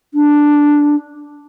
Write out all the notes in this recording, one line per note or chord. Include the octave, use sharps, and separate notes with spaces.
D4